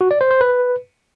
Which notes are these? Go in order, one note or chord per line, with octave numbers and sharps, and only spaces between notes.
F#4
D5
C5
C5
B4